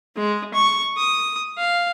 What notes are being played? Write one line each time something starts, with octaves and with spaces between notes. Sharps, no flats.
G#3
C#6
D#6
F5